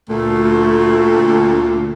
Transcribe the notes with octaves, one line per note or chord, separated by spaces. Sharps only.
D2 A#2 A3